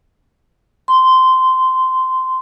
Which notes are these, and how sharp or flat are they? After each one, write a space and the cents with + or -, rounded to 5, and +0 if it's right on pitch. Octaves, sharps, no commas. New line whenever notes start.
C6 -15